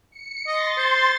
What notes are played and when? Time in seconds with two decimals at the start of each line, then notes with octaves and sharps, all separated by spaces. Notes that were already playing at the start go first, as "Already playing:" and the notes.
0.10 C#7
0.47 D#5 C6 A6
0.78 C5